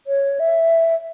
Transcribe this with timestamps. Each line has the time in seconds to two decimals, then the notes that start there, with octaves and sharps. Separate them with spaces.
0.07 C#5
0.40 E5